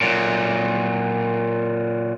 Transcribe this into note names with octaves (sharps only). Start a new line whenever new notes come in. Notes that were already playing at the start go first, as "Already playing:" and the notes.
A#2 F#3